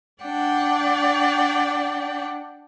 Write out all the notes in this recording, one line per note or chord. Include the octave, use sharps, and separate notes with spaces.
D4 D5 F#5 G5